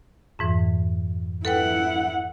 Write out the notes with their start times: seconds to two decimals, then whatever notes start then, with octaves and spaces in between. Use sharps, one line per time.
0.39 F2 G#2 E3
1.45 E4 A4 B4 F#5 G5